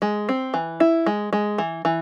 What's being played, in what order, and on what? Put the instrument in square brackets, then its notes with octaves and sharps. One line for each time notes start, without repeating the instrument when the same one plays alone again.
[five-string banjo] G#3
C4
E3
E4
G#3
G#3
E3
E3